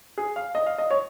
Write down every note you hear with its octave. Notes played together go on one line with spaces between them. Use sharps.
G#4
F5
D#5
F5
D#5
C#5